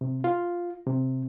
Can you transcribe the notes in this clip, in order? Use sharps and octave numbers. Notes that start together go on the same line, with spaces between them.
C3
F4
C3